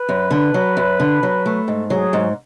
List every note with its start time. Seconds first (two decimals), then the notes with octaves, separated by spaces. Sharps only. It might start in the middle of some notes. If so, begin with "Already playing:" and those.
Already playing: B4
0.09 F#2
0.31 D3
0.54 F#3
0.77 F#2
1.00 D3
1.23 F#3
1.46 A3
1.68 G#2
1.90 F#3 G#4
2.13 G#2